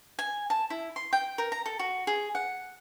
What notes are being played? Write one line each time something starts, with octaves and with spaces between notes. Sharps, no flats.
G#5
A5
E4
C6
G5
A#4
A#5
A4
F#4
G#4
F#5